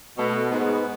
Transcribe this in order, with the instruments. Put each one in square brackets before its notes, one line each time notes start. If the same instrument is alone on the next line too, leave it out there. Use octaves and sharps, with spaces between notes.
[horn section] B2 [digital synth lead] A3
[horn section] G#2 [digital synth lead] B3